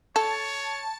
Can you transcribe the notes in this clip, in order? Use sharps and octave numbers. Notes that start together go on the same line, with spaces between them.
A4 C#5 A5